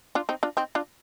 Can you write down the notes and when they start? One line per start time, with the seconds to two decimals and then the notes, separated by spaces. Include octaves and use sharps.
0.15 D4 F4
0.29 C4 D#4
0.43 D4 F4
0.57 C4 D#4
0.75 D4 F4